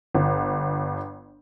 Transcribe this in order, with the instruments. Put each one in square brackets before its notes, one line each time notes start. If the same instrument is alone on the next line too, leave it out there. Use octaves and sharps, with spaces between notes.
[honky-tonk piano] G1